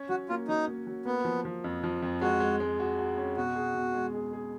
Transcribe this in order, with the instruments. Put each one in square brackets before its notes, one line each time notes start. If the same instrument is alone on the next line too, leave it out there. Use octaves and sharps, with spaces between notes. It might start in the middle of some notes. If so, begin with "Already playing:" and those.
Already playing: [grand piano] C#4
[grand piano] F#3 [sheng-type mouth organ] F#4
[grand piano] A#3 [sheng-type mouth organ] F4
[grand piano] F#3 [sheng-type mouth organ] D#4
[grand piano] A#3
F#3
[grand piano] A#3 [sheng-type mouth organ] B3
[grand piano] F3
F3
F2
F3
F2
[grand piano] G#3 [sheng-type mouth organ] F#4
[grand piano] G#3
G#3
F#4
F#4
C#4
[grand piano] B2 [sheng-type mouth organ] F#4
[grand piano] G#4
B2
G#3
G#4
G#4